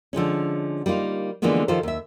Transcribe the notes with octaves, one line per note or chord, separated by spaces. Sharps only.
D3 F3 G#3 C#4
G3 A#3 D#4 F4
D3 E3 F3 G#3 A#3 B3
D#3 F3 F4 G4 A4 C5
D#2 E5